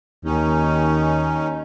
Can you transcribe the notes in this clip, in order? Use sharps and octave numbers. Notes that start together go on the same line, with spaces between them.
D#2 D#3 C#4 D#4